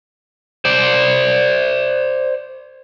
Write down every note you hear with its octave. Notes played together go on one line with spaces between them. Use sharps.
C5 D5